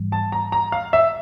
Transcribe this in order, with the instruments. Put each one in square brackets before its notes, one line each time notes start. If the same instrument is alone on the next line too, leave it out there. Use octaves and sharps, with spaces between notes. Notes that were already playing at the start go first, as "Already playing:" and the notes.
Already playing: [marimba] G#2 E3 G3
[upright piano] A5
A#5
A#5
F5
E5